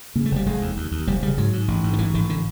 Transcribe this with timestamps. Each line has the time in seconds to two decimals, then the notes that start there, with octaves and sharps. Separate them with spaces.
0.15 C#3 A#3
0.26 A3
0.31 F1 G3
0.46 F1 G#3
0.61 D#2
0.77 D#2
0.92 D#2
1.07 F1 G3
1.23 C#3 G3
1.38 G#2 F#3
1.53 G#2
1.68 A1
1.84 G#2
1.93 D#3
1.98 A1 E3
2.14 A1 D#3
2.30 D3